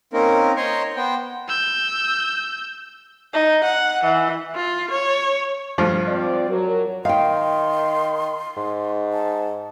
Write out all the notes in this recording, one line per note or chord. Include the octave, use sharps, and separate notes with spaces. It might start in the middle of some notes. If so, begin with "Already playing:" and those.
A#3 C4 C#4 D#4 A#4
C5 C#5 D#5 A#5 C6 C#6
B3 C5 G5
E6 G6
D#4
F#5
E3
F4
C#5
G2 F3
C4 F4 D5
F#3 A#4
D#3 F5 G5 C6
G#2
A5